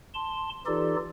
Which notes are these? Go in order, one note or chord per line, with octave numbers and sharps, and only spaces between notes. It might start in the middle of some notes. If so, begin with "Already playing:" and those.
A5 C6
E3 D#4 F4 G4 A4 D5